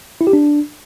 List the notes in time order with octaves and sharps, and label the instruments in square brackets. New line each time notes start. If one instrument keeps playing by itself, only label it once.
[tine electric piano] E4
G4
D4